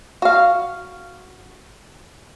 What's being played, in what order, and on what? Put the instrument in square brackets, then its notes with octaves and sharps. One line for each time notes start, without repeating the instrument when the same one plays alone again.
[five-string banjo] F#4 F5